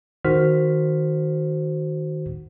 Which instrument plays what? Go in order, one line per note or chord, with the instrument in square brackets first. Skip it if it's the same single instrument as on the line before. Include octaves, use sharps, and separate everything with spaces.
[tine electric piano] D#3 F#4 C5 F6 B6